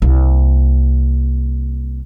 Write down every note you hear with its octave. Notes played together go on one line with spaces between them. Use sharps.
C2 A#3